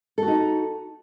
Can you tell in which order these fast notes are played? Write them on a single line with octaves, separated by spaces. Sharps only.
A4 F#4 D#4